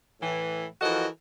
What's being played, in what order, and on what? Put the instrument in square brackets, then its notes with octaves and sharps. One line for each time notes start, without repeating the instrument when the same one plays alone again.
[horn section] A2 E3
E3 F3 F#4 A4 A#4 D#5